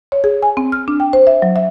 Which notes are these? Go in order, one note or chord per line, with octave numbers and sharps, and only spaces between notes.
C#5
G#4
G#5
C4
F6
D4
G5
C5
E5
F#3
E5